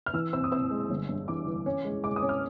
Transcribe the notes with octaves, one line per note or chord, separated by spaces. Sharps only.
F6
E3 E6
C4 E6
D#6
C4 E6
G#3
G1
G2
E3 D6
E3
C#4
G#3
G#3 D6
D#6
C#4
F6